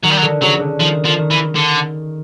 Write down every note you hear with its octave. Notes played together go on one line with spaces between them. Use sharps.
D#3 F#3
G3
F#3
D3
C#3 F#3
D3
D#3 F3
D3 F3
D#3
E3
D3